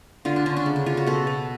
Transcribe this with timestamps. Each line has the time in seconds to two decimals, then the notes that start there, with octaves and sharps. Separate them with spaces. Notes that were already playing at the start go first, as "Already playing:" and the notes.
0.25 D3 F4
0.36 D4
0.46 D3 C#4
0.57 D4
0.66 C#3
0.76 D4
0.86 C#3 F4
0.97 F#4
1.06 B2 A4
1.27 B2